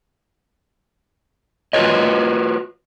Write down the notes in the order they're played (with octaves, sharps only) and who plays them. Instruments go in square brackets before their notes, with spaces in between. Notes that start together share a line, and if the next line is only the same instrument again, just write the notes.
[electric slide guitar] F4 F#4 A4 B4 C#5 D#5